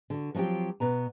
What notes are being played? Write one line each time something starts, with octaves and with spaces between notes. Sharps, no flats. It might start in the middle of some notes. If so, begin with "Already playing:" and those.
D3 F#4
F3 F#3 C4 F4 G4
B2 B3 A#5